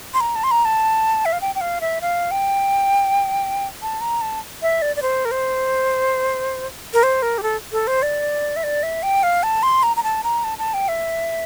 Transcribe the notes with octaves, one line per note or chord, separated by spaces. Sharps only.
C6
A#5
A5
C6
A#5
A5
E5
F5
G5
G5
F5
E5
F5
G5
A5
A#5
A5
E5
D5
D5
C5
A#4
C5
A#4
C5
A#4
G4
A4
A4
C5
D5
E5
D5
E5
G5
F5
A5
C6
A#5
A#5
A5
A#5
A5
A5
G5
E5